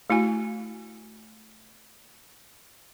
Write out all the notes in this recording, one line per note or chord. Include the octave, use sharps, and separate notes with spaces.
A3 E4 F#4 G#5